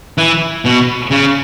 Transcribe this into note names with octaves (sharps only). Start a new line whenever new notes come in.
E3
B2
C#3